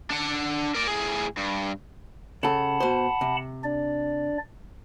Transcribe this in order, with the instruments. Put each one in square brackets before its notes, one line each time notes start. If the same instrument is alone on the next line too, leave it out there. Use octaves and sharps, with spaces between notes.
[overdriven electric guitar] D4 F#5
A#4 D5
A2 G#4
G2
[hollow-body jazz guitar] C#3 A4 [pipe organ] F#5 A5 B5
[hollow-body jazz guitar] B2 C5
C3
[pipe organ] D4 D5